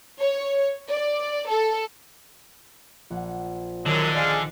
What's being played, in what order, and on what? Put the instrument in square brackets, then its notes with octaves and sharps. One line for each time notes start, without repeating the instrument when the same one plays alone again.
[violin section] C#5
D5
A4
[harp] A#1 F#5
[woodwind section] F#2 F#3 G#3 [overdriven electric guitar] D3 [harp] D#3
[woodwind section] G#3 D5 F5